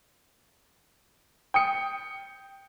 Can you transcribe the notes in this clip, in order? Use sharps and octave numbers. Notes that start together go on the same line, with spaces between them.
G5 D#6 C#7